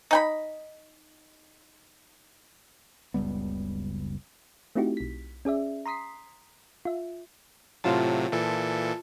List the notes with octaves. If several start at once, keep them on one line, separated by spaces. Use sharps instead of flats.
D#4 G5 B5
F#1 C#2 G3 B3
A3 C4 D#4 E4 F#4 G4
B1 B6
C#4 G#4 D5 E5
A#5 C6 D#6 B6 C7
F4 E5
A2 C3 F#3 F4 A5
A#2 E3 A4